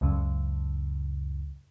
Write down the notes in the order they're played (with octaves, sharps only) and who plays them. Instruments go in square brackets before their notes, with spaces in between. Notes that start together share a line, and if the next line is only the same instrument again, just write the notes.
[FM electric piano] C#2 F#2 C#3